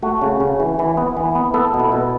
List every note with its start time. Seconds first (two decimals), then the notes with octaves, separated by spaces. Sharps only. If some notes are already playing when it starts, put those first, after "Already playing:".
0.02 A3 F#4
0.22 C#3
0.40 C#3
0.60 E3
0.79 E3
0.97 B3
1.17 E3
1.35 B3
1.54 B3 A4
1.74 B2
1.80 E4
1.92 B2